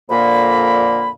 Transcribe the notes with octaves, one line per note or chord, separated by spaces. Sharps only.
F2 A#2 D3 A#3 B5